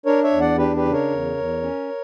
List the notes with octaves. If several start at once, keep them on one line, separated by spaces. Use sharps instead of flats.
D4 A#4 C#5
C#5 E5
E2
D5 F#5
D4 G4 B4
G4 B4
C#3
A#4 C#5
E2
E2
C#4